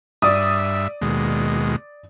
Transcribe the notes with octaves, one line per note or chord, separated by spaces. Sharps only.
G2 D5 E5 D#6
D#2 B2 G#3